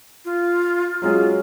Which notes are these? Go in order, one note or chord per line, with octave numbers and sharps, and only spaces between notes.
F4
F#3 G#3 C#4 F4